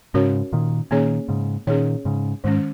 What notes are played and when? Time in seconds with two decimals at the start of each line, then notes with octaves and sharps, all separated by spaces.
0.14 G#2 C#3 C#4 F#4 A#4 C#5
0.53 A#2 D#3
0.91 A#2 D#3 A#3 C#4 G#4 C#5
1.29 G#2 C#3
1.67 A#2 D#3 C#4 G#4 C#5
2.05 G#2 C#3
2.44 G#2 D#3 G#3 C#4